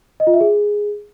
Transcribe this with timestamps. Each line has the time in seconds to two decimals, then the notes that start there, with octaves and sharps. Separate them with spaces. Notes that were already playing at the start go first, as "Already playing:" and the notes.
0.20 D#5
0.27 F4
0.34 E5
0.40 G#4